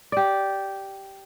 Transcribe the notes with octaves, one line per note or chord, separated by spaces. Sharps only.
G4 D5